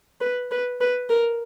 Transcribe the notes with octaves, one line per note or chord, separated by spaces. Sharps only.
B4
B4
B4
A#4